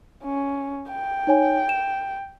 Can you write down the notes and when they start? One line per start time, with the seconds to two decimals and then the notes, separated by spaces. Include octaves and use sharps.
0.24 C#4
0.91 G5
1.27 D#4 C#5 G#5
1.69 E7